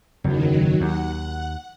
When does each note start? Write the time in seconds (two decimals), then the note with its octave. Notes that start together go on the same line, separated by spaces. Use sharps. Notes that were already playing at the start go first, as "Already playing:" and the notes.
0.24 F#1 E2 D#3 F#3
0.80 D#2 F#5